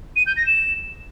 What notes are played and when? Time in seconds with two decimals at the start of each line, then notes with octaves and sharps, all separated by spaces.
0.16 D#7
0.26 G6
0.37 A#6
0.47 E7